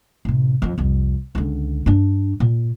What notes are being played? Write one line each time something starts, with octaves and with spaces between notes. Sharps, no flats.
A1 C3
F2 F3
C2 F2
C#2 D3
G2 D4
A#2